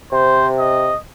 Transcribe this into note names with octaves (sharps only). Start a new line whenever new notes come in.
C3 C5
D#5